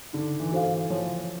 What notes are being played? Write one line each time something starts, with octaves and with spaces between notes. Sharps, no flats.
D3 D#4
E3
F#4 A4 C5 F5
E3
F3 C#5